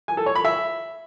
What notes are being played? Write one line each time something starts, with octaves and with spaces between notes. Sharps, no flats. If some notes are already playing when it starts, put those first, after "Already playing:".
G#5
A4
C#5
B5
E5